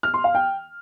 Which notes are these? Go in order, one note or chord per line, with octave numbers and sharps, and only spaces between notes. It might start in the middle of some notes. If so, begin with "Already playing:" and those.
F6
C6
F5
G5